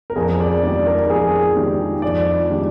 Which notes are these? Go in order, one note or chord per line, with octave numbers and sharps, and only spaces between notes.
A#4
F2 G#4
D5
D#3 G#3 D4 G4 D5
A#4
F2 G#4
D#3 G#3 D4 G4
F2 D5
D#3 G#3 D4 G4